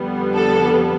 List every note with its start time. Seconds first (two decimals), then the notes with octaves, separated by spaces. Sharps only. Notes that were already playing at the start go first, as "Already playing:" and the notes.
Already playing: F2 D3 G3 B3
0.35 A4